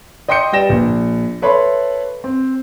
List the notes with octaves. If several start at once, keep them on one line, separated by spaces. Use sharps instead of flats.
D#5 G5 C6 D6 G6 C#7
G3 B4 D5 G5 A#6 E7
A#1
A4 B4 C#5 E5 B5 C6
C4